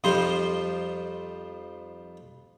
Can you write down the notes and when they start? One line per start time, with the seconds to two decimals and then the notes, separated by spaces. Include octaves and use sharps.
0.04 F2 F3 G3 D#4 C5 C6